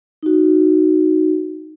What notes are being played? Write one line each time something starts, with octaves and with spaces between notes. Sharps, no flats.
D#4 F#4